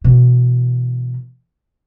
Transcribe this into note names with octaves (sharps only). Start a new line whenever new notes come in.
B2 E3